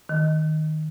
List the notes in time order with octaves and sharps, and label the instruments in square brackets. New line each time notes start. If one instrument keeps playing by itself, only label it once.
[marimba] D#3